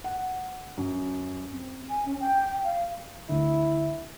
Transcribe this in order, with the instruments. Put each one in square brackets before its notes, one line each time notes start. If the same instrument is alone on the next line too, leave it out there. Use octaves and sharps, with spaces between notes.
[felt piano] F#5
F#2
[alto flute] C4
G#5
C#4
G5
F5
[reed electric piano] D2 D3 [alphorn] E4